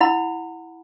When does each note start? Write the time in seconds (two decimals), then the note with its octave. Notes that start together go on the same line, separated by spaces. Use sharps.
0.01 E4 F#5 B5